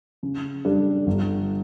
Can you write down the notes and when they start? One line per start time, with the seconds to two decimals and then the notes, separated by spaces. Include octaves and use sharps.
0.23 C#3
0.65 G3 D4 A4 D5
1.07 G1